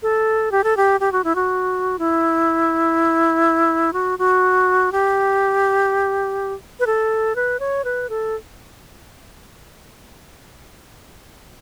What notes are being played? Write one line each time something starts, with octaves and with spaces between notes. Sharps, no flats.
A4
G4
A4
G4
G4
F#4
E4
F#4
E4
F#4
F#4
G4
B4
A4
B4
C#5
B4
A4